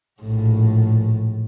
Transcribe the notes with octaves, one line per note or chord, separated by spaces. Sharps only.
A#1 A2